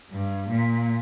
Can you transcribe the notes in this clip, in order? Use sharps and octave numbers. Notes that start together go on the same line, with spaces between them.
G2
A#2